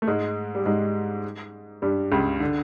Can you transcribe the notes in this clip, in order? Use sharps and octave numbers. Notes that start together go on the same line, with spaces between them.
A3
G#2 G#3
G3
G#2 G#3
G2 G3
C#2 C#3
D3